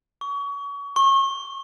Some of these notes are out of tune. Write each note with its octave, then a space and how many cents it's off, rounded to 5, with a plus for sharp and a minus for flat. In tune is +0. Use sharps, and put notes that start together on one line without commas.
C#6 +30
C#6 -35